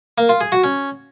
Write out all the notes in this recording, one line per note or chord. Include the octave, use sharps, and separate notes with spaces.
A#3
F4
G#4
F#4
C#4